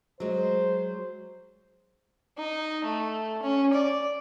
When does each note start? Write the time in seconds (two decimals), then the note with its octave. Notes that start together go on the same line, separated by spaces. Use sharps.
0.20 F#3 G#3 C5
2.38 D#4
2.84 A3
3.42 C#4
3.73 D5